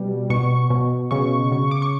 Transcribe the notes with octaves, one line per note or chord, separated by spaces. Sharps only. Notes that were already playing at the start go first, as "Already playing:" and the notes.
Already playing: B2 G3
B2 C#6
B2
C#3 C#6
C#3
D6
C#6